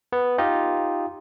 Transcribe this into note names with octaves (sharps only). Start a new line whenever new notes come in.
B3
D#4 F4 G4 D#5